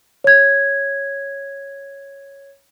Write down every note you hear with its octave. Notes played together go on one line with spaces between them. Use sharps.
C#5 G#6